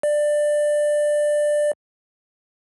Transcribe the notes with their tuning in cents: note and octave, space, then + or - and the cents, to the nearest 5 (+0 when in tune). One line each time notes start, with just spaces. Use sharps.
D5 +15